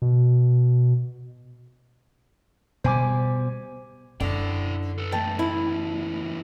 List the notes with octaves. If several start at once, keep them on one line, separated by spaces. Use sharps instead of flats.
B2
B2 G3 C5 G#5 D6
F#2 D3 C#4 E4 G5
A4 B4
E2 A3 G5 A5
E4